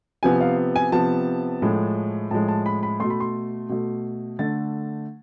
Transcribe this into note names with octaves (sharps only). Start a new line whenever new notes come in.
C3 F3 B3 G#5
F5
G#5
C3 F3 B3 A5
A2 F3 G#3
A2 F3 G#3 A5
A5
B5
B5
B2 A3 C6
B5
C6
B2 A3
D3 A3 A6